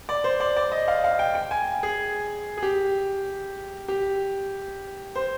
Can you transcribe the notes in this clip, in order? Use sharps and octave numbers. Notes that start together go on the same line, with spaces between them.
D5
C5
D5
D5
D#5
F5
F5
G5
G5
G#5
G#4
G#4
G4
G4
C5